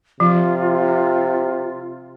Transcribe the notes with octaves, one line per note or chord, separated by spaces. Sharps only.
C3 F3 F4